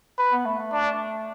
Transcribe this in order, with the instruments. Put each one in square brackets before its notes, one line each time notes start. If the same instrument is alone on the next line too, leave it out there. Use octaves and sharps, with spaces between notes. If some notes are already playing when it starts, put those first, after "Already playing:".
[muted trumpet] B4
[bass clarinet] B3
A3
A3
[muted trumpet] D4